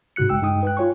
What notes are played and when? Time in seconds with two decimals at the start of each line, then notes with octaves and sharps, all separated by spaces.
0.16 G#2 C#3 F#4 F#6 C#7
0.29 A#1 G#3 G5 E6
0.42 G2 G#3 D#4 G5 D#6
0.63 B4 G5 F#6
0.77 F4 C#5 G#5 C#6